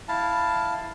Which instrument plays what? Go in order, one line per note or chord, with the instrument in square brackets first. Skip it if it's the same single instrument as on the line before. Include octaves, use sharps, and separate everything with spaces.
[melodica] E4 F5 A5